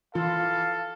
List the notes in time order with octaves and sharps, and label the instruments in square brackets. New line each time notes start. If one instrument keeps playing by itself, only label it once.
[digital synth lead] E3 [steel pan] F4 [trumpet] A4 [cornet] F5